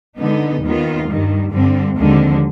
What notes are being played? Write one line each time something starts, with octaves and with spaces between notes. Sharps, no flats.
D3 G#3 B3 D#4
D#2 D#3 B3 F4
G2 D#3 G3
G2 D3 G3 C4
D#2 D3 F3 G#3 C4